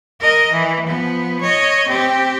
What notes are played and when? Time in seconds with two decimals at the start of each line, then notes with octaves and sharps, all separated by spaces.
0.20 A#4 D#5
0.52 E3
0.87 F3 B3
1.41 C#5 D#5
1.88 C4 G4